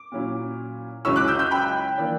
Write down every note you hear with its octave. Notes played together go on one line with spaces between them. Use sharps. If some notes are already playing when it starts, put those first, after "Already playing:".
Already playing: D6
A#2 F#3 C#4 E4
C#2 C#3 F#3 C#4 E4 C#6 E6
D6 F#6
E6 G6
E6 G6
G5 B5
E3 A#3 D4